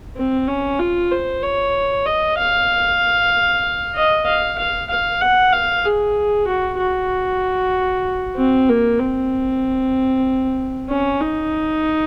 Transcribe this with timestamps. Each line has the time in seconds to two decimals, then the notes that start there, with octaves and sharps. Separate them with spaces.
0.17 C4
0.48 C#4
0.80 F4
1.12 C5
1.42 C#5
2.06 D#5
2.38 F5
3.95 D#5
4.26 F5
4.58 F5
4.90 F5
5.22 F#5
5.53 F5
5.85 G#4
6.47 F#4
6.79 F#4
8.36 C4
8.69 A#3
8.99 C4
10.90 C#4
11.21 D#4